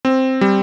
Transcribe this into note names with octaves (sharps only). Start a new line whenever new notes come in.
C4
G3